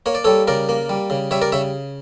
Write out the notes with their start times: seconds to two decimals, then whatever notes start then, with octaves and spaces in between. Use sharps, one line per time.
0.06 A#3 C#5
0.15 D5
0.24 G3 A4 C#5
0.47 C#3 A#4 D5
0.69 A#3
0.89 G3
1.10 C#3
1.31 G3 C#5 E5
1.42 A#4 D5
1.52 C#3 C#5 E5